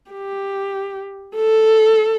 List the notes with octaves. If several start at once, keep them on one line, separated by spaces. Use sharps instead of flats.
G4
A4